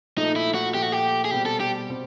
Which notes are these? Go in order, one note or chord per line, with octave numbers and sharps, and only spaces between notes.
A#2 F3 A3 D#4
E4
F#4
A#2 F3 A3 G4
F#4
G4
G#4
B2 G3 C4 G4
A4
G4
B2 G3 C4